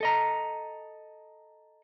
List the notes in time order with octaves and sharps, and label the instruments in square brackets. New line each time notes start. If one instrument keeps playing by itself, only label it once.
[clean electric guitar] A4 D#5 A#5